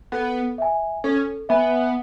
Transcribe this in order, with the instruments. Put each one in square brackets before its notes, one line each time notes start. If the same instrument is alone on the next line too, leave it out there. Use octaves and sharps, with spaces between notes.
[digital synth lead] B3 [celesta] A4
[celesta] E5 G#5
[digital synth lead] C#4 [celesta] A4
[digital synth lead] B3 [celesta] E5 G#5